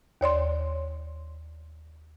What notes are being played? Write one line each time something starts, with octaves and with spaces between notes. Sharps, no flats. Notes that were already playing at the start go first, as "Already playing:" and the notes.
D#2 C#5 D5 C6